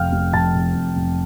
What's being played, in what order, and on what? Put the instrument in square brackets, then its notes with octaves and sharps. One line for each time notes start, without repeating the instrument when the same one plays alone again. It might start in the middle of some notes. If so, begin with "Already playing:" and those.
Already playing: [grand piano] F1 F2 C3 F5 G5 F6
F1
F2 A5 A6
C3
F1
F1